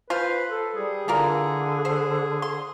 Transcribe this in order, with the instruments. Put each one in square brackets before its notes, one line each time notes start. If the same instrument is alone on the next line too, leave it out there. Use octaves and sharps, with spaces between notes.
[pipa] F4 C5 [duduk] B4
[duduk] A4
[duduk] G3 [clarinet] G#4
[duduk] D3 [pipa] E3 F4 A#4
[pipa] C5
C6